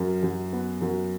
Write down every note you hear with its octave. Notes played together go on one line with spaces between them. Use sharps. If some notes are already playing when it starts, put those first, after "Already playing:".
Already playing: F#2
F#2
B3
F#2